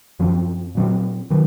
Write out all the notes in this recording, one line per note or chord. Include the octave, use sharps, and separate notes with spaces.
F#2 F3 C4
A#2 F#3 C4
D#3 F#3